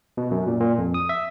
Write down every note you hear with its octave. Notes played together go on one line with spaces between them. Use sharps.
B2
F#2
A#2
A#2
F2
D#6
E5